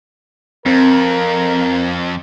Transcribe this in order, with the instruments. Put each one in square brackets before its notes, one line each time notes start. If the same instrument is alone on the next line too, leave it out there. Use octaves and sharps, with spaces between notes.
[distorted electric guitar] F2 [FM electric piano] C4 [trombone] A#4